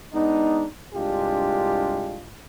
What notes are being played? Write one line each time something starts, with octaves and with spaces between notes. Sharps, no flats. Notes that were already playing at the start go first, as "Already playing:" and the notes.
G#3 B3 D4 D#4
C2 G2 G#3 D4 F4 G4